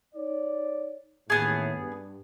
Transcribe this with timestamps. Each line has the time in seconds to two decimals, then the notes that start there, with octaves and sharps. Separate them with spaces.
0.15 D#4 C#5 D5
1.30 A1 D#2 A2 B3 G#4
1.77 G2